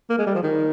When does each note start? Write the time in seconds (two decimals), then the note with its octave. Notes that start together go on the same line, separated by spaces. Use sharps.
0.10 A#3
0.18 G#3
0.27 G3
0.35 F3
0.43 D#3